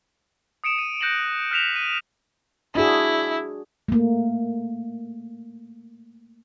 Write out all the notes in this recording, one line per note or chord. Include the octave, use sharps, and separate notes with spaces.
D#6 C#7 D7 E7
D#7
F#6 G6 A#6 C#7 E7 F#7
F6 F#6 A#6 B6 E7 F7
D#7
D4 E4 F#4 G#4
A3 A#3